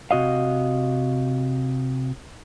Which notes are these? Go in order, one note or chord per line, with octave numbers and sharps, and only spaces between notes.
C3 F#4 D#5 F5